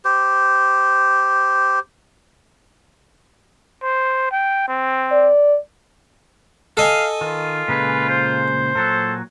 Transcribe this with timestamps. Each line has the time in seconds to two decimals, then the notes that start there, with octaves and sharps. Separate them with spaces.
0.05 G4 C5
3.83 C5
4.32 G5
4.68 C4
5.11 D5
6.77 A4 D#5 F5 G#5
7.21 D#3 F4
7.68 A#2 C#3 G#3 B4
8.09 C5
8.76 A#2 F#3 A4